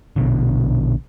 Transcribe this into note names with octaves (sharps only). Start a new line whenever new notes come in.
A#1 B2 D3